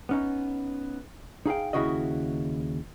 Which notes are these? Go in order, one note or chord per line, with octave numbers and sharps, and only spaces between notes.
B3 C#4 D#4
D#4 G#4 F5 G5
D#2 A#2 C#3 E4 F#4 D#5